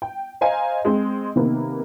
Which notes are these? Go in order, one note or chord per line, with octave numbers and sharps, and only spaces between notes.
G5
C5 D#5 F5 G#5 A#5
G#3 C4
C3 D#3 A#3 B3